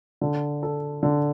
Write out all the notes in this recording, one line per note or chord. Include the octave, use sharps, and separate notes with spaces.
D3
A4
D3